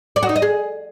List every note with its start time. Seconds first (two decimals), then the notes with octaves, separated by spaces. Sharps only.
0.16 D5
0.23 F#4
0.29 D#4
0.36 D#5
0.42 G#4